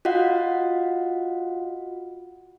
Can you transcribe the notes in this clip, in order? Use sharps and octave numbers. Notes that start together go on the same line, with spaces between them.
F4 F#4 D#5 F5 F#5